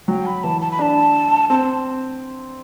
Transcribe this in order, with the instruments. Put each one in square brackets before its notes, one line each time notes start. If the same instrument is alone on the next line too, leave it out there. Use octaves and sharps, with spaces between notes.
[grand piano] F#3 [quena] G5
[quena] B5
[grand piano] E3 [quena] A5
[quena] A5
B5
[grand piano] D4 [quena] A5
[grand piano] C4 [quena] A5